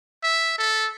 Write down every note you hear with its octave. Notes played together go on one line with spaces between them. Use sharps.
E5
A4